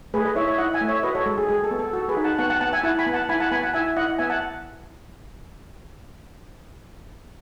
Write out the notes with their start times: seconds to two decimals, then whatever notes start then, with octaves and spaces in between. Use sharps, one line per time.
0.14 A3 G#4 B4
0.25 B4 D#5
0.36 E4 C#5 E5
0.47 C#5 E5
0.58 E4 D#5 F#5
0.73 E5 G#5
0.81 A3
0.88 C#5 E5
1.03 F#4 B4 D#5
1.15 A4 C#5
1.26 G#3 A4
1.38 G#4
1.48 G#3 G#4
1.64 A4
1.71 B3
1.79 A4
1.93 F#4 A4
2.09 G#4 B4
2.17 D#4
2.24 F#5 A5
2.39 B3 F#5 A5
2.50 F#5 A5
2.61 B3 F#5 A5
2.73 E5 G#5
2.83 E4 F#5 A5
2.99 G#5 B5
3.07 B3
3.13 F#5 A5
3.29 E4 G#5 B5
3.40 F#5 A5
3.52 B3 G#5 B5
3.63 F#5 A5
3.74 E4 E5 G#5
3.96 E4 D#5 F#5
4.18 B3 E5 G#5
4.30 F#5 A5